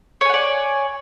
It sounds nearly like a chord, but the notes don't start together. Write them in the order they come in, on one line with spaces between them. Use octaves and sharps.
C#5 G#5 F#5 D5